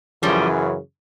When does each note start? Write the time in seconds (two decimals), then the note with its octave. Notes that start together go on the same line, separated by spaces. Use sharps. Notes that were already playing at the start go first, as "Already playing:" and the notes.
0.22 F#2 C#3 E3 F3 G3